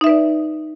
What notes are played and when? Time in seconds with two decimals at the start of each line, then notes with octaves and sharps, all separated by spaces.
0.01 D#4
0.04 E5
0.07 B4
0.09 D5